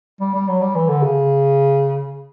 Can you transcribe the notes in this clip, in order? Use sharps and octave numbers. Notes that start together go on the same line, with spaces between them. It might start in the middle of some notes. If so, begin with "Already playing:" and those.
G3
G3
F#3
G3
E3
D3
C#3